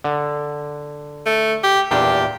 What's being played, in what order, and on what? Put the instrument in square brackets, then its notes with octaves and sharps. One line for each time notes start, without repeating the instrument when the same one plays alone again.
[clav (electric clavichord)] D3
[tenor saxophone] A3
G4
[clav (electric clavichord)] E2 A#2 D4 [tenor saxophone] G4